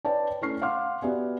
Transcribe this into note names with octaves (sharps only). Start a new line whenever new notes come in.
B4 C#5 D5 G5 A5
A3 C#4 E4 C#6 F6 C7
F5 F#5 C6 D6 F6
B3 F#4 G4 D5 E5 G#5